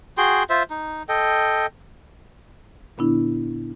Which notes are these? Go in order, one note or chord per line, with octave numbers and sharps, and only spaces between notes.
F#4 G#4 G5 C6
F4 C5 E5
D#4
A4 D#5 G5
A#2 D3 B3 D4 E4